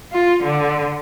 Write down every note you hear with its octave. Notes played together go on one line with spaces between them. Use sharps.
F4
D3